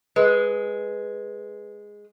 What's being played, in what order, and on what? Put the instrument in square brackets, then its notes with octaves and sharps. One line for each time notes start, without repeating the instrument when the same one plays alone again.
[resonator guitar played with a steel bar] G#3 [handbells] B4